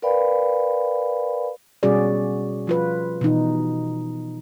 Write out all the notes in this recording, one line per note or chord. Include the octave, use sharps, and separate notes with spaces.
A#4 B4 D5 F5 G5 B5
B2 G3 C#4 F#4 G#4 D5
F3 F4 B4
B2 E3 D#4